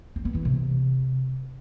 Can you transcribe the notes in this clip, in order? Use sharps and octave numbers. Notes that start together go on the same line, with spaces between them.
C4
B3
E3
C3